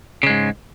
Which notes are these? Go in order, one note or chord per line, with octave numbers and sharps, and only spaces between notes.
G#2 C#3 G#3